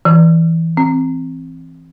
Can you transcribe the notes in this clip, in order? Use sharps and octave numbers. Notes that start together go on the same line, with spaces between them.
E3
C4